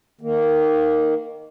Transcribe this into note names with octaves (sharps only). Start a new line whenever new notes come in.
D#3 A#3